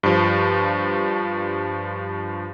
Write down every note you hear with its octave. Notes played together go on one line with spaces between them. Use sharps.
G2 F3